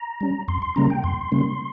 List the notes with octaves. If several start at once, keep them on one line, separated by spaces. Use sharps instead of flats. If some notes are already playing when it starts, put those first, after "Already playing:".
Already playing: A#5
G3 C#4
F2 C6
C6
C#3 G3 A#3 C#4 A#5
G5
F2 C6
C#3 G3 A#3 C#4